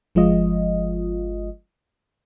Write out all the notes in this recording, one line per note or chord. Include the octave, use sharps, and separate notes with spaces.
G1 F3 G#3 F4 D#5